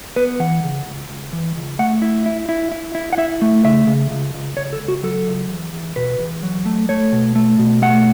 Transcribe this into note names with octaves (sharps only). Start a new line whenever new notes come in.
B3 B4
E3 F#5
C#3
C#2
C#2
E3
C#2
A3 F#5
E4 E5
E4
E4
E4
E4
F#5
E4 E5
A3
C#3 E5
C#3
C#2
C#2
C#2 C#5
A4
C#2
F#4
F#3 A4
C#2
E2
E2
B2 B4
E2
F#3
A3
A3 C#5
B2
A3
B2
A3 F#5